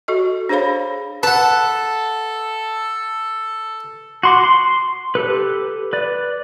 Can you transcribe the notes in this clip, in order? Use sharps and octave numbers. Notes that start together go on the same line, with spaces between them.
F#4 A4 D#5
D4 G#4 C5 C#5 F5 B5
A4 B4 F#5 A5
F#4 C6 D6
C6
G4 A4 B4
B4 D5